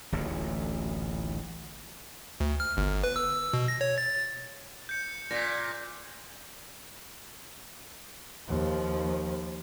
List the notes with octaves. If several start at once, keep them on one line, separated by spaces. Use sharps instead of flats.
D1 A1 D2 A#2
D2
F6
G1
B4
E6
B2
A#6
C#5
A6
G6 C#7
A#2 A#6 B6
D#2 F3